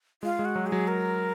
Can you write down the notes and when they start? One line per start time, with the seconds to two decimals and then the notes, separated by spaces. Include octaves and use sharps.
0.23 G#3 F4
0.39 G#3
0.45 F#4
0.56 F#3
0.67 G#4
0.72 F#3
0.88 A#4